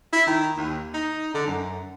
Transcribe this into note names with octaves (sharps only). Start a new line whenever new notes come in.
E4
D#3
D#2
D#4
D3
F#2